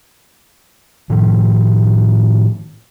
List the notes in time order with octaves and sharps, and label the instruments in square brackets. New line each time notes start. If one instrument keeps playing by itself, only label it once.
[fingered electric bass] A2 D#3 F3